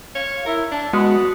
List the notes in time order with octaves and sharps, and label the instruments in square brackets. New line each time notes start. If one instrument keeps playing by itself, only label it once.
[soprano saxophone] C#5 [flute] F5
[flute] E4 [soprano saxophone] A#4
[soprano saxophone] D4 [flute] A5
[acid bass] G#3 [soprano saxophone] B3 [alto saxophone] F#4 [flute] D#6